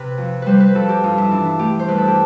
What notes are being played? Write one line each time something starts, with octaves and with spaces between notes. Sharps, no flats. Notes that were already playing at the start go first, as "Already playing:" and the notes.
Already playing: C3 B4
F2
G3 B4 C5
B4
F2 A4
G4
G2 F4
E4
E3 D4
E4
A3 G4
C5
G2 B4
A4
G4